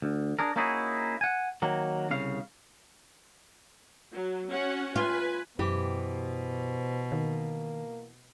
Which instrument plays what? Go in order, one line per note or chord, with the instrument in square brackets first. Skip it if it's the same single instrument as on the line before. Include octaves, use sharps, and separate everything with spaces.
[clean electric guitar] D2
D4 G#4 A#4
A#3 C#4 D#4 E4 F#4 G#4
F#5 G#5
D#3 F#3 A#3
C2 C#3 F5
[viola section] F#3
C#4 F#4 F#5
[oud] F4 [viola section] B4 G#5
[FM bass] F#2 [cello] B2 [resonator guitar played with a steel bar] E3 G4 [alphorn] C5
[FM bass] D#3 [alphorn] A#3